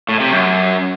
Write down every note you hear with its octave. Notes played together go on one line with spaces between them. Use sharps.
A2
C3
F#2